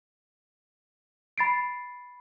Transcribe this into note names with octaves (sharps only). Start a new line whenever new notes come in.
B5 A6 C7 D7